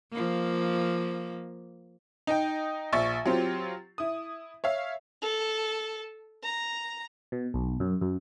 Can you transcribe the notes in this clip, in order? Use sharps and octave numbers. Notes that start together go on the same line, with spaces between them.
F3 A#3
D#4 D#5 G5
A#1 E5 C#6 A6
F#3 C4 F4 G4
E4 D#6
C#5 E5 F5
A4
A#5
B2
B1
F#2
F#2